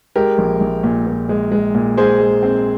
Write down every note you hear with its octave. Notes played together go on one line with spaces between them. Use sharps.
G#3 G4 A#4
A#1
A#1
A#2
A#2
G#3
G#3
A#2
G#3 G#4 C5
G#3
C4